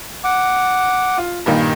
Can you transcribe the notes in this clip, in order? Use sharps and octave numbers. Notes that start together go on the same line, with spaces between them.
F#5 D6
F4
G2 A#2 D#3